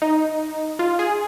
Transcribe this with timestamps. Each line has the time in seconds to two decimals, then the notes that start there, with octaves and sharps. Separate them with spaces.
0.02 D#4
0.79 F4
0.99 G#4